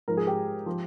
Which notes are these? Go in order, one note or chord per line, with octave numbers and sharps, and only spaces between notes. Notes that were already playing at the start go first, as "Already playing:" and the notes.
G#2 F3 A#4
G#4
G4
F3